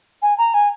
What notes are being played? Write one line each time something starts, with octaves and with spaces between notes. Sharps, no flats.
G#5
A#5
G#5